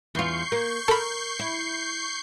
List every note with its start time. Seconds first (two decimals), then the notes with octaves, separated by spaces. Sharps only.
0.15 E2 F4 C#6 G6 C7
0.52 A#3
0.88 A4 A#4 B5
1.39 E4